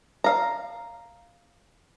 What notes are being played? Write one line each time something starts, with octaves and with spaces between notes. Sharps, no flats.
F5 A#5